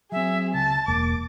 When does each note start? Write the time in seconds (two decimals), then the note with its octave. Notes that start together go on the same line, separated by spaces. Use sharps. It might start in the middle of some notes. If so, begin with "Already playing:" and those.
0.12 F#3 C4 G#4 E5
0.54 C#2 A5 A6
0.88 E1 A#3 D6